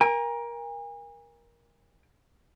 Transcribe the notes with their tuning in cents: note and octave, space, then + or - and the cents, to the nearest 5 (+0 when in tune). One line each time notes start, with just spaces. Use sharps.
A#4 +20 G#5 -35